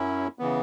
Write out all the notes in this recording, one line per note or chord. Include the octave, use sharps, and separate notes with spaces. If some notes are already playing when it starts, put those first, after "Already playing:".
Already playing: F#2 F#3 C#4 E4
C#3 E3 B3